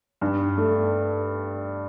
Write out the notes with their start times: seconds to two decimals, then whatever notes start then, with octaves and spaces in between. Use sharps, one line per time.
0.21 G2
0.58 A3